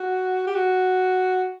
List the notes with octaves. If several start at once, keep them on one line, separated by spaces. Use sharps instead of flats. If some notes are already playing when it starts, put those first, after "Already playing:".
Already playing: F#4
G4
F#4